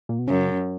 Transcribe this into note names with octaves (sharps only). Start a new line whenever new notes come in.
A#2
B2
F#2 C#3